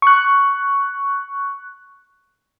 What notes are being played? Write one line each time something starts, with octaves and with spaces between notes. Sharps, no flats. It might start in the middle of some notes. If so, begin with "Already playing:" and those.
C#6 F#6